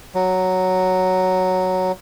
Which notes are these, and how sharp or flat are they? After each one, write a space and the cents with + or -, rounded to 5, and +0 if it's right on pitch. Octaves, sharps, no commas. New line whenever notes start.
F#3 +5